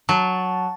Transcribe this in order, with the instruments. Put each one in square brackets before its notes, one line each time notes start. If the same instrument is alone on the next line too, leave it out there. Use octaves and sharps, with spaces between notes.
[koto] F#3 [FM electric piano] A5